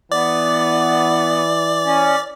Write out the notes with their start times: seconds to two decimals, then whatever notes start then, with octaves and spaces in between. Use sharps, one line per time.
0.12 E3 B3 D5
1.85 C#4